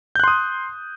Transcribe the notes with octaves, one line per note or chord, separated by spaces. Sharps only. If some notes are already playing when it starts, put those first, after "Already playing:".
C6 D#6 F#6 G6